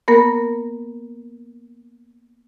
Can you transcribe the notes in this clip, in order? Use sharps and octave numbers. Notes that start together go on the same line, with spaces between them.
A#3 B3 A#4